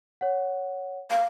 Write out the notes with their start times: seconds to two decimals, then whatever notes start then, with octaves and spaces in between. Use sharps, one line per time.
0.21 C#5 F#5
1.11 F5